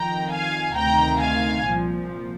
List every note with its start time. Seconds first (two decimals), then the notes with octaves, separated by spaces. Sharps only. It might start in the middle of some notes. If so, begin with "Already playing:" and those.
Already playing: F2 D#3 G5 A#5
0.31 F5 G#5
0.76 D2 C3 D#3 G5 A#5
1.21 F5 G#5
1.66 C2 A#2 F3